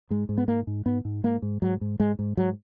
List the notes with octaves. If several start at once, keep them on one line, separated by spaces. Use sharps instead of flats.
G#2 G#3
G#2
B3
G#2 A#3
G#2
G#2 B3
G#2
G#2 A#3
G#2
G#2 F#3
G#2
G#2 G#3
G#2
G#2 F#3